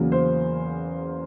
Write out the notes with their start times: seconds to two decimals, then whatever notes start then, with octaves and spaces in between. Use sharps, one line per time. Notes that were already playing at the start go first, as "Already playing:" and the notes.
Already playing: E2 C#3 F#3 A#3
0.12 C5